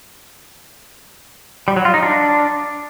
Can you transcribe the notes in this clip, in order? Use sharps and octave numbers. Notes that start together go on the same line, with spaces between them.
G3
F#3
F4
D#4
D4